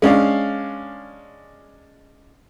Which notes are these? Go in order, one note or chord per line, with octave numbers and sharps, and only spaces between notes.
G#3 C#4 D4 F5